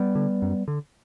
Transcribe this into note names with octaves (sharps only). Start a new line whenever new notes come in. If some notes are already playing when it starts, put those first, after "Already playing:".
Already playing: G3 B3
D3
F#2
D3